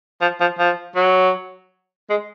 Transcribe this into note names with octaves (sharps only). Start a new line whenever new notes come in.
F3
F3
F3
F#3
G#3